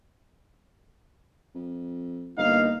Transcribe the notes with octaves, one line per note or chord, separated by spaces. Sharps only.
F2
G1 A#3 D#4 F5